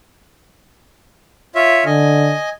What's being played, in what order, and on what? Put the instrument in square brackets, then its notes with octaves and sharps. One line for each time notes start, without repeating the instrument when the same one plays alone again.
[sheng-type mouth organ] F4 C#5 E5
[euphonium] D3 [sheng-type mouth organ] D#5 G#5